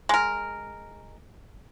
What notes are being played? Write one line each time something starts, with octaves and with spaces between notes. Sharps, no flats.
G#3 A#4